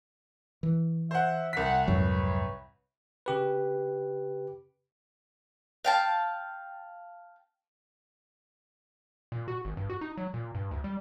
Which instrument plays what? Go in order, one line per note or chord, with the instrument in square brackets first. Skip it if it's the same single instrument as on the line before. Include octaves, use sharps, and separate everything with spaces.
[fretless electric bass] E3
[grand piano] C5 F#5 [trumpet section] E5
[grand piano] C2 B6 [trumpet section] F#5
[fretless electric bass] F2 G#2 F#3 [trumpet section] B4 C#5
[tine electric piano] C#3 G4 B4
[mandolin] F5 G5 A5
[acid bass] A#2
F#4
G#1
G2
F#4
D#4
F#3
A#2
G2
D2
G3